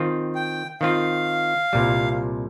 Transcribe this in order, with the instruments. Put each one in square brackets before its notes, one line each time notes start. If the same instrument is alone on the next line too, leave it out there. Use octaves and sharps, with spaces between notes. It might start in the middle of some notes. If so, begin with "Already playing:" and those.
Already playing: [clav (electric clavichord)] D#3 C4 F4
[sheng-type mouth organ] G5
[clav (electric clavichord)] D#3 C4 F4 [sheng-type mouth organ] F5
[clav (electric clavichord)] C2 A#2 G3